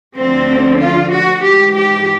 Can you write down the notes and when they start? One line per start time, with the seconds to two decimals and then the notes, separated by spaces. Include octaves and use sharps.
0.17 D2 D3 F3 C4
0.80 F4
1.11 F#4
1.42 G#2 E3 G4
1.74 G4